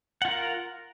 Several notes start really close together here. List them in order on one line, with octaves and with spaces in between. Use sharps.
F#5 F4 A#4